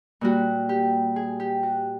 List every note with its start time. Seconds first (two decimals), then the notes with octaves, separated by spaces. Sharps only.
0.21 A#2 G3 F#4
0.69 G4
1.16 G#4
1.40 G4
1.63 F#4